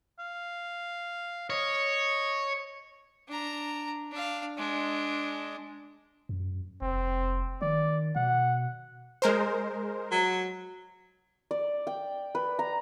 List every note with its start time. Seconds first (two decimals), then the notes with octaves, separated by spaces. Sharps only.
0.19 F5
1.50 C#5 D#5
3.28 D4 A#5
4.11 D4 F5
4.57 G#3 D4
6.29 F#2
6.82 F1 C4
7.62 D#3 D5
8.16 B2 F#5
9.22 G#3 A#4 C5
10.11 F#3
11.51 D5
11.87 G5
12.35 B4
12.59 A#5